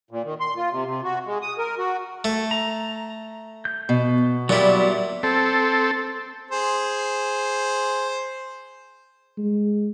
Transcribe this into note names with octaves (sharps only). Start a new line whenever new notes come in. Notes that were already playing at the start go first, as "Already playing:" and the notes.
A#2
D#3
C6
F4
C3
C3
F#4
G#3
D#6
A#4
F#4
A3
A#5
G6
B2
A#2 F#3 G3 E4
C4 A4
G#4 C5
G#3